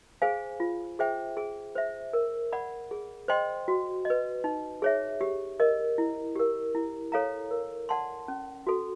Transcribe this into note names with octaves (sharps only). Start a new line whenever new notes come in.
G#4 C5 F5 G#5
F4
G#4 C5 E5 G5
G#4
C5 E5
A#4
D5 F#5 B5
G#4
C5 D#5 G5 C6
F#4
D#5
B4
D#4
G#4 C#5 E5
G4
A#4 D#5
E4
G4 A#4
E4
A4 C#5 F5 A#5
A#4
D5 F#5 A5 C6
C#4
F#4 A4